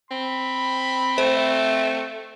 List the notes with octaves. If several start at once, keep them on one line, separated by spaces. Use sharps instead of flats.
C4 B5
A3 C5